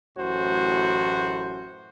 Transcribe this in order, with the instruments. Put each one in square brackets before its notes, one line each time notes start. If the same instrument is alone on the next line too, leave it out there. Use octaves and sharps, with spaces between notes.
[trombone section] A1 F#2 A2 F#4 C5